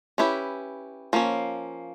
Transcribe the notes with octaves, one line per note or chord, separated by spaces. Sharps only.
C#4 E4 G4 B4
F3 A#3 C#4